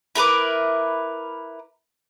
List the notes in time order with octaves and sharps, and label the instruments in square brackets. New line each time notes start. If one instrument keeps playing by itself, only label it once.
[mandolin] E4 A#4 B4 D6